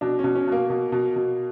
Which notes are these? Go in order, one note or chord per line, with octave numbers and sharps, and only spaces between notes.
B2 D4
C#4
B2
C#4
B2 A#3
B2
B2
B2